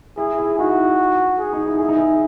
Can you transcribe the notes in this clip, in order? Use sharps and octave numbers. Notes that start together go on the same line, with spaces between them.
E4 G#4
E4
D#4 F#4
G#4
D#4
E4
E4 G#4
D#4
E4